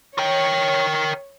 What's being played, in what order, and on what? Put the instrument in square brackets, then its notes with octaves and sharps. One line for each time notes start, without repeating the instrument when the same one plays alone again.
[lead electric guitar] A#4 G5 [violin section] C#5